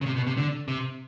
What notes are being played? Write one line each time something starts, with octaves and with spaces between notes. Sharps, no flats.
C#3
C3
B2
C3
D3
C3